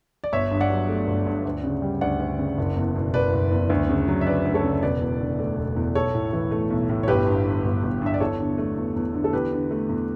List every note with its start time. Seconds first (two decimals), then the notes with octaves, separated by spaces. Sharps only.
0.24 D5
0.32 G1 C#5 E5
0.51 G2
0.60 D5 F#5
0.70 F#3
0.89 A3
1.07 G1
1.26 G2
1.45 D2
1.64 C#3
1.82 G3
2.01 D2 D5 F#5
2.20 D2
2.39 C#3
2.58 F#1
2.76 E2
2.95 B2
3.14 F#1 B4 D5
3.33 F#1
3.51 E2
3.70 D2
3.89 C#3
4.08 F#3
4.21 E5
4.26 D2 B4 D5
4.45 D2
4.54 A4 C#5
4.64 C#3
4.82 E1 B4 D5
5.01 E2
5.20 D3
5.39 A3
5.58 E1
5.76 E2
5.95 B1 A4 C#5
6.14 A2
6.33 E3
6.51 A3
6.70 B1
6.89 A2
7.03 C#5
7.08 G1 G4 B4
7.27 G2
7.45 D3
7.64 G1
7.83 G1
8.02 G2 E5
8.14 D5
8.20 E2 A4 C#5
8.39 D3
8.58 A3
8.77 E2
8.96 E2
9.14 D3
9.24 A4
9.33 E2 G4 B4
9.52 D3
9.71 A3
9.89 E2